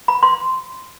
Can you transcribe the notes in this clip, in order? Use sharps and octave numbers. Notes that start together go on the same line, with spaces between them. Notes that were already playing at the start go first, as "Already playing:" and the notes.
B5
C6